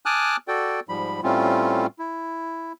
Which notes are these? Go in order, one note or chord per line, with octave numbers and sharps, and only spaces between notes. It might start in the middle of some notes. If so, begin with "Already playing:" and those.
G#5 A5 D6 D#6 F6 F#6
F#4 A4 D5 G5
G#2 F3 G3 B5
A2 G3 A3 C4 C#4 F4
E4